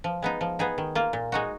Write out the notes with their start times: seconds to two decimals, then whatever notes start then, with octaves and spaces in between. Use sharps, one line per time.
0.04 F3
0.22 G#3 B3 D#4
0.41 F3
0.59 B3 D#4 G#4
0.78 D#3
0.95 A#3 F4
1.13 A#2
1.32 G#3 D#4 F#4